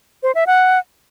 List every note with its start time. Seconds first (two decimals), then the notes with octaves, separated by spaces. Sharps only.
0.23 C5
0.35 E5
0.47 F#5